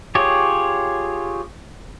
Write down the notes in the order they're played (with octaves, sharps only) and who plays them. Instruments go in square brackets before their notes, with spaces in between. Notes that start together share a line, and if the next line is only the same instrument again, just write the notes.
[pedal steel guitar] F4 G4 G#4 C#5